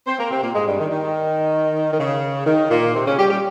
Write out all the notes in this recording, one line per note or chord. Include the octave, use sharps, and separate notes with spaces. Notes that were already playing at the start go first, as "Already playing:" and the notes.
C4 C5
A#3 A#4
C3 C4
A#2 A#3
G#2 G#3
G2 G3
D#3
D#3
D#3
C#3
D#3
A#2 A#3
C3 C4
C#3 C#4
G3 G4
G3 G4